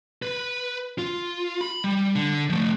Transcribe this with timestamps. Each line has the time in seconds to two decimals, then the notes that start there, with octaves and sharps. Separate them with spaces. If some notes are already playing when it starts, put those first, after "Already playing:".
0.22 B4
0.98 F4
1.61 B5
1.84 G3
2.15 D3
2.50 F3 A3